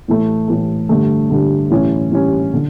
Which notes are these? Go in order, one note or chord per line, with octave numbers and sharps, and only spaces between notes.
A2 E3 A3
A2 E3 A3
G2 D3 A3
G2 D3 A3
A2 E3 G3 C#4
A2 E3 G3 C#4
D3